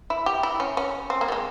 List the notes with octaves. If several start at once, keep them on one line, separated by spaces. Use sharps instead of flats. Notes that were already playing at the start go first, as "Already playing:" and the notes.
E4
G4
E4
C#4
C#4
C4
A#3
G3
G#3